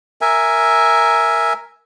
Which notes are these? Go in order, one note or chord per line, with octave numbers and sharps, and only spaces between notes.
A#4 E5 G#5